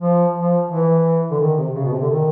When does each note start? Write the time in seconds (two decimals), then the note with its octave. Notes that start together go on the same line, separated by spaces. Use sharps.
0.01 F3
0.36 F3
0.71 E3
1.31 D3
1.40 D#3
1.58 C3
1.75 C#3
1.84 B2
1.93 C3
2.02 D3
2.10 D#3